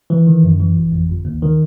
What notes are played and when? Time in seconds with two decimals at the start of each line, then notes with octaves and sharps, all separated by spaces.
0.10 E3
0.27 D#3
0.43 F#2
0.60 E3
0.76 G#1
0.92 F2
1.09 G1
1.25 D#2
1.42 D#3